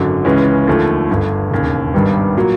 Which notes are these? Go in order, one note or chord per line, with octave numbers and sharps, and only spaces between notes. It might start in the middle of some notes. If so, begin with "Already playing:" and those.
Already playing: G#1 F#2 D3 F#3
C#2 C#3 E3 G#3 C#4
D#2 D3 F3 A3
G1 G2 D3
E1 D#2 C#3
G#1 G2 D#3 G3 B3
A#2 F#3 A#3